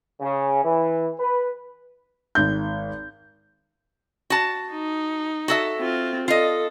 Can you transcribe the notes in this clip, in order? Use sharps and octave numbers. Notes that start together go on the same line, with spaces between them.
C#3
E3
B4
G#1 G6
F#4 A5
D#4
F#4 A4 E5
C4 F4
F4 A4 D#5